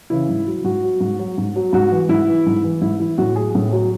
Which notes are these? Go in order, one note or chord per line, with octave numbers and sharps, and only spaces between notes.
C#3 E3 E4
G#2
F#3
G#2 F#4
F#3
G#2
F#3
G#2
F#3
G#2 F#4
E3
G#2 E4
E3
G#2
E3
G#2 E4
E3 E4
A2 F#4
F#3 G#4
A2
F#3